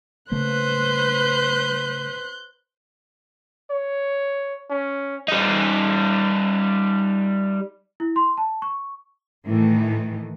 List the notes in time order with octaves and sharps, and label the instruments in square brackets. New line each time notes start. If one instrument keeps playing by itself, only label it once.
[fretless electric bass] C#3 A3 A#3 [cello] B4 C5 [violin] F#6 G6
[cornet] C#5
C#4
[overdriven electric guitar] G3 D#4
[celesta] E4
C6
A5
C#6
[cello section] A2 D#3 E3 A3